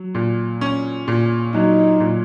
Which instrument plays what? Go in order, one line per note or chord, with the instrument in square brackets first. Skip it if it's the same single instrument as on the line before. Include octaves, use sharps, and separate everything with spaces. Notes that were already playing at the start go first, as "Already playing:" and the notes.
Already playing: [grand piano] F#3
A#2
C#4
A#2
[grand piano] F#3 [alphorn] D#4
[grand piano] A#2